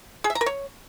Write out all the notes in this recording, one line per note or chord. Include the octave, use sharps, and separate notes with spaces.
G#4
E5
A#5
A#4
C#5